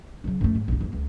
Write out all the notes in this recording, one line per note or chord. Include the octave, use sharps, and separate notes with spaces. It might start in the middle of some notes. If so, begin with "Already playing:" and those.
C#3 F#3
F#2 A3
G#2
A#1 D#4
E2 A#3
C#2